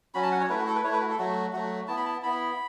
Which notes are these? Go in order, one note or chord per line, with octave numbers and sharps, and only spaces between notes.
F#3 C#4 F#4 B5
A5
F#5
C#5
A3 E4 B4
F#4
A4
B4
A3 E4 C#5
B4
F#4
A4
F#3 A3 F#4
F#3 A3 F#4
B3 E4 A5
B5
A5
B3 E4 B5